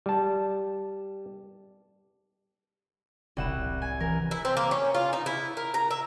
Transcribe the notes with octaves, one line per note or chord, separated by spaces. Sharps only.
G3 A5
E1 C2 F#5 E7
D1
G#5
E3 A#4
E4
C4
A#3
C#4
F4
D#4
E4
A#4
A#5
E5